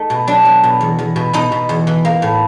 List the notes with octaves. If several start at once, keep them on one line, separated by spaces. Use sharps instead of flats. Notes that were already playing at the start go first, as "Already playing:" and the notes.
Already playing: A3 D#4
B2
F#3 D4
F#3
B2
E2
E2
B2
B2 D#4
B2
E2
E3
A#3
A2